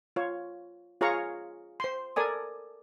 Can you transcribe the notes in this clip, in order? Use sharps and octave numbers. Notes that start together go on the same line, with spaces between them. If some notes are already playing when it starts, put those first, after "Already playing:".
F4 C#5
F4 G#4 C#5 F5 A#5 C#6
C5 C6
A4 A#4 D5 G#5 D#6